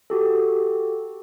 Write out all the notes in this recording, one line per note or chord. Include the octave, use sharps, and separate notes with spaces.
F#4 G4 A4